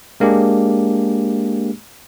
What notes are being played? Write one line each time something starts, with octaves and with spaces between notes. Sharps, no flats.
G#3 A#3 D4 G4 G#4